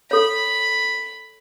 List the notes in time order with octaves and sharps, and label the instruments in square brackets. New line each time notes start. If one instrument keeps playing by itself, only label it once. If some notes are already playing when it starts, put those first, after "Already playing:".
[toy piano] A4 C#5 [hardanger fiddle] B5